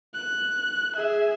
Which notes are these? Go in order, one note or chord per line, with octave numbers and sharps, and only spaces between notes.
F#6
G#4 E5